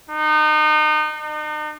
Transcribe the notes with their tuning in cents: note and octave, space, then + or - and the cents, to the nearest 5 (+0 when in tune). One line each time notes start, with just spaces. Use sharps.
D#4 -30
D#4 -40